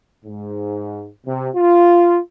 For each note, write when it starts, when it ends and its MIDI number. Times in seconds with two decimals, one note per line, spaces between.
0.25 1.08 44
1.26 1.48 48
1.55 2.18 65